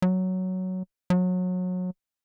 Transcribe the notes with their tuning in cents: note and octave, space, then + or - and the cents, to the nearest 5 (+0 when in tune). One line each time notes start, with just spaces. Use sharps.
F#3 +5
F#3 -25